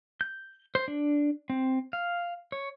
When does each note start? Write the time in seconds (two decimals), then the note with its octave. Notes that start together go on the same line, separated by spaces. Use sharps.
0.21 G6
0.75 C5
0.88 D4
1.50 C4
1.93 F5
2.52 C#5